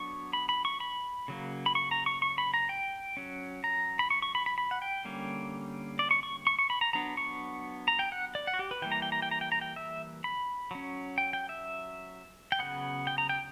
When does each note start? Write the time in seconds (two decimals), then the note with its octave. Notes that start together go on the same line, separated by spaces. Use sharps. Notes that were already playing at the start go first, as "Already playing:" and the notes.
Already playing: F#3 B3 D4 C#6
0.33 B5
0.49 B5
0.65 C#6
0.80 B5
1.28 C#3 F#3 A#3
1.66 B5
1.75 C#6
1.91 A#5
2.06 C#6
2.22 C#6
2.38 B5
2.54 A#5
2.69 G5
3.17 F#3 C#4
3.64 A#5
3.99 B5
4.10 C#6
4.22 C#6
4.35 B5
4.46 B5
4.58 B5
4.71 F#5
4.82 G5
5.05 D3 G3 A#3 C#4
5.99 D5
6.11 C#6
6.23 C#6
6.47 C#6
6.59 C#6
6.70 B5
6.81 A#5
6.93 F#3 B3 D4 A#5
7.17 C#6
7.88 A#5
7.99 G5
8.12 F#5
8.35 D5
8.47 F#5
8.54 F#4
8.59 G4
8.71 B4
8.82 E3 G3 A#3 G5
8.92 A#5
9.02 G5
9.12 A#5
9.22 G5
9.31 A#5
9.41 G5
9.52 A#5
9.61 G5
9.76 E5
10.24 B5
10.71 F#3 C#4
11.18 G5
11.33 G5
11.49 E5
12.52 G5
12.59 C#3 F#3 B3 F#5
13.07 G5
13.18 A#5
13.29 G5